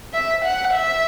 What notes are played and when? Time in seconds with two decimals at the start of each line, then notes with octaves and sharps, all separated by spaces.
0.14 E5
0.44 F#5
0.74 E5